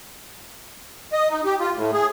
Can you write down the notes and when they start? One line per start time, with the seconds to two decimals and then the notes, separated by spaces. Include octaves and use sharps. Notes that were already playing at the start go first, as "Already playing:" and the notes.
1.12 D#5
1.31 D#4
1.45 G4
1.60 F4
1.76 A2
1.93 G#4